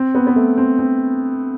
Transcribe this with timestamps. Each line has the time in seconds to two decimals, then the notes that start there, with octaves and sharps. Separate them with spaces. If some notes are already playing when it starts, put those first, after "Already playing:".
Already playing: C4
0.15 B3
0.27 B3
0.36 A3
0.57 C4
0.79 C4